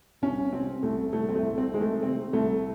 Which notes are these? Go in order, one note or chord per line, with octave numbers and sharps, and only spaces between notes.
C2 C#4
C3 C4
C2 A3
C2 A3
C4
A3
C2
C4
D#3 G#3
A3
C3 C4
C2 A3